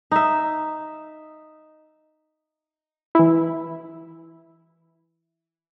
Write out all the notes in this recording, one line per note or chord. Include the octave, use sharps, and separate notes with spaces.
D#4 E5
E3 E4